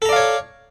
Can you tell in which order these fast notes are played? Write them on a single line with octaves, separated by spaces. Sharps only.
A4 A#5 D5 F5 C#5